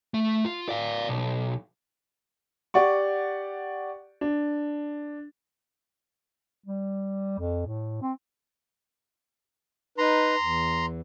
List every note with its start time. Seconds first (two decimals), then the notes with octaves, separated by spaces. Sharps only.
0.14 A3
0.44 F4
0.69 D5 F5
1.09 B1
2.74 G4 D5 F#5 C#6
4.21 D4
6.66 G3
7.39 F2
7.67 A2
8.02 C4
9.98 D#4 B4 A#5 C6
10.39 E2